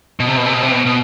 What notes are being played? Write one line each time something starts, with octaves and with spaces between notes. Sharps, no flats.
B2
C3
B2
C3
B2
C3
B2
B2